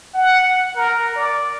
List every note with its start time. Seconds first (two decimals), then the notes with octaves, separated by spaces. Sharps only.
0.14 F#5
0.76 A#4
1.16 D5